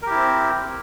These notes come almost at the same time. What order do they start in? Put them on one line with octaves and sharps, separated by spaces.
A#4 G4 E4 C4